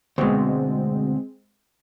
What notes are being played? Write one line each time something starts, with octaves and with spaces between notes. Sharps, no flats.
D2 B2 G#3 C4